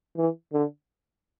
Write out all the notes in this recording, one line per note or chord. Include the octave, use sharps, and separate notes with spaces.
E3
D3